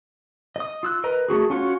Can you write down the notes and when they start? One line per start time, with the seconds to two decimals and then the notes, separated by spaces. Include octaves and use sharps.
0.56 D#5 D#6
0.83 F4 E6 F#6
1.04 A#4 B4 D#5 A#5
1.28 A3 D#4 F#4 G#4
1.50 C#4 F4 F#4 C#5